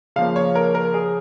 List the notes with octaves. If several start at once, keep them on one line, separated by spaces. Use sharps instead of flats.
C#3 F3 A#3 F5
C#5
A#4
A#4
G#4